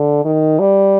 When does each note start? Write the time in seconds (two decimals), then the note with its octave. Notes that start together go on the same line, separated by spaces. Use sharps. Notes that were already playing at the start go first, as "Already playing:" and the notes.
Already playing: D3
0.25 D#3
0.59 G3